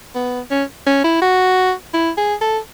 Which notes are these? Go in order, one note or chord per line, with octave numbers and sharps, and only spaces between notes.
B3
C#4
C#4
E4
F#4
E4
G#4
A4